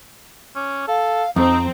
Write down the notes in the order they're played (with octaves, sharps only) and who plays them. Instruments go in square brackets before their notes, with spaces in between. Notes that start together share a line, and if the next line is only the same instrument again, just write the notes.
[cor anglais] C#4 [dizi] D6
[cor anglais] A4 [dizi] F5
[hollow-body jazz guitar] F2 [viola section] C4 [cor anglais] D#4 [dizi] A#5